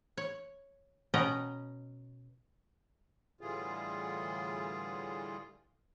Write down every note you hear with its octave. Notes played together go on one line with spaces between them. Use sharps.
C#5
B2 C#4 D#5 F#5 G5 A#5
A2 D3 E3 G3 F4 G#4